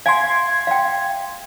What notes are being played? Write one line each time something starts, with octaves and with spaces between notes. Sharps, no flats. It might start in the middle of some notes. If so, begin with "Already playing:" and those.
F5 G#5 C6 G#6
F5 G5